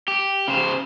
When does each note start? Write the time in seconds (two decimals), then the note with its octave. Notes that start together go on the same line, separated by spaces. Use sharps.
0.08 G4
0.48 C#3 C5